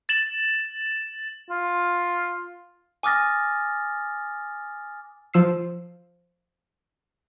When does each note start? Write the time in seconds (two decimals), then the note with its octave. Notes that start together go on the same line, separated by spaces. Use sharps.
0.09 A6 E7 F#7
1.50 F4
3.03 G#5 D6 D#6 F6 A6 A#6
5.34 F3 E6 C7